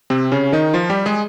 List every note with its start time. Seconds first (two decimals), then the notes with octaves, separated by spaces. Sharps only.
0.10 C3 C4
0.32 C#3 C#4
0.52 D#3 D#4
0.74 F3 F4
0.90 G3 G4
1.06 G#3 G#4